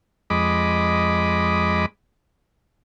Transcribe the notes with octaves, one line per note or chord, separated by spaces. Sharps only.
F2 G#3 D#5 B5 D6